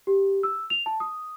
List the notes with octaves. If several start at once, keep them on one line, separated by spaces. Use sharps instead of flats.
G4
E6
F7
A5
D#6